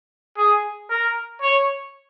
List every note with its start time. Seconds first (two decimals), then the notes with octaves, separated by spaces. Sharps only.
0.38 G#4
0.90 A#4
1.42 C#5